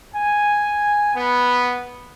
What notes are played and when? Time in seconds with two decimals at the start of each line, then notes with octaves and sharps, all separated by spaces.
0.13 G#5
1.15 B3